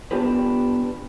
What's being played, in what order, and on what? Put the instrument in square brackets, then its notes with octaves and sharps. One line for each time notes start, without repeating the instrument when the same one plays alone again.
[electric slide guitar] B3 D4 F4 G4 B4